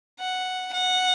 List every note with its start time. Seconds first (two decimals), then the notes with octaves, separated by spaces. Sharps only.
0.20 F#5
0.73 F#5